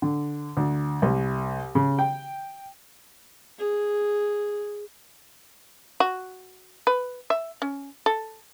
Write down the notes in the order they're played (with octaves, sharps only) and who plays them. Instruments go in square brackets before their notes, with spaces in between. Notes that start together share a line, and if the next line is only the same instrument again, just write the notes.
[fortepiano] D3
D2
C2
C#3
G5
[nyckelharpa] G#4
[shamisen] F#4
B4
E5
C#4
A4